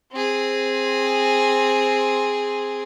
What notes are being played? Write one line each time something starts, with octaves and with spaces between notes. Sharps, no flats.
C4 G#4